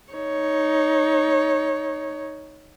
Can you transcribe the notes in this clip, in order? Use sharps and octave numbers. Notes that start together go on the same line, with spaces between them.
D#4 C#5